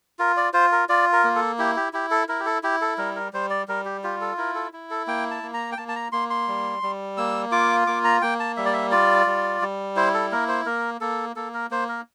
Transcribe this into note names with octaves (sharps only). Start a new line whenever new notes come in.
F4 A#4
D5
F4 C5
A#4
F4 D5
A#4
A#3
A4
E4 G4
G4
E4 G4
A4
E4 A#4
G4
A4
E4 G4
A4
G3 A#4
A#4
G3 C5
D5
G3 A#4
G4
F4 G4
A4
E4 A#4
A4
E4
A4
A#3 G5
A5
A#3
A#5
G5
A#3 A5
A5
A#5
A#3 C6
C6
G3
G3
A#3 E6
F4 D6
A#3 D6
A#5
A#3 G5
A5
G3 E5
D5
E5
F4 D5
G3
G3
E4 C5
A4
A#3 A#4
C5
A#3 A#4
A#3 A4
A#3 A4
A#4
A#3 C5
A#4